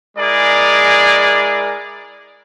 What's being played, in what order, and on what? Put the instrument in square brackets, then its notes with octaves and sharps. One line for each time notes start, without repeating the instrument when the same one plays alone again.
[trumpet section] G#3 E4 G#4 A#4 D5